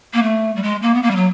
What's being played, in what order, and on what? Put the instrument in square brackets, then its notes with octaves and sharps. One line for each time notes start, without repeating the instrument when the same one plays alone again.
[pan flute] A#3
A3
G3
G#3
A#3
B3
A#3
G3
F#3